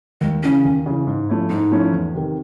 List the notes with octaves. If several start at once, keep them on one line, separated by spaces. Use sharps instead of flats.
D#2 G#3
C#3 E3 C#4
D#2
C#3 E3
G#2
F3 A3 C#4 E4
G#2 D#4
F3 A3 C#4 E4
E2
C3 D#3